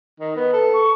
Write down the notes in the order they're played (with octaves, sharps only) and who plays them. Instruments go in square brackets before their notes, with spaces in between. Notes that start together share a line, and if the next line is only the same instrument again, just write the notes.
[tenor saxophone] D#3
[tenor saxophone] B3 [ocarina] B4
[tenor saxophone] A4
[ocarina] C#6